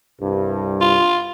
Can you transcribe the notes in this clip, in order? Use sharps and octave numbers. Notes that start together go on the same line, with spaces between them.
C2 G2
F4